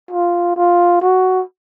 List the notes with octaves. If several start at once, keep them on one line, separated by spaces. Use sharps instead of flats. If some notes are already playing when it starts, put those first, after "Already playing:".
F4
F4
F#4